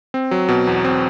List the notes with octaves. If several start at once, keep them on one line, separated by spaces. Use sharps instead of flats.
C4
F#3
B2
E2
C4